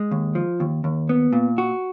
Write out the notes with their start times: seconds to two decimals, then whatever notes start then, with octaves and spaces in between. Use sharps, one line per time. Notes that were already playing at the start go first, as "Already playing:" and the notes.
Already playing: G#3
0.11 D#2
0.35 F3
0.60 D#2
0.84 D#2
1.09 B3
1.33 A#2
1.58 F#4